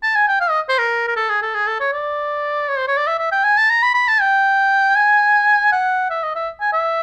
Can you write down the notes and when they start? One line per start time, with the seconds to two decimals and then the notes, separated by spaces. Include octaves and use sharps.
0.03 A5
0.16 G#5
0.28 G5
0.41 F5
0.50 D#5
0.69 C5
0.78 A#4
1.08 A#4
1.16 A4
1.29 G#4
1.42 A4
1.54 G#4
1.67 A4
1.80 C#5
1.93 D5
2.69 C#5
2.78 C5
2.88 C#5
2.97 D5
3.07 E5
3.19 E5
3.32 G5
3.44 G#5
3.58 A5
3.70 A#5
3.83 B5
3.95 B5
4.08 A5
4.21 G5
4.96 G#5
5.72 F#5
6.10 E5
6.23 D#5
6.36 E5
6.61 G#5
6.73 E5